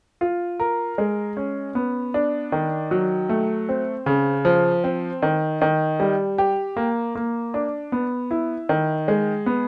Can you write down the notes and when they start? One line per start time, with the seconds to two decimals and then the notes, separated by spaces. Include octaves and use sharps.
0.21 F4
0.60 A#4
0.98 G#3
1.37 C#4
1.75 B3
2.14 D4
2.52 D#3
2.91 F#3
3.29 A3
3.69 C4
4.06 C#3
4.45 F3
4.84 C4
5.23 D#3
5.62 D#3
6.00 G3
6.38 G4
6.77 A#3
7.15 A#3
7.54 D4
7.92 B3
8.31 E4
8.69 D#3
9.08 G#3
9.46 B3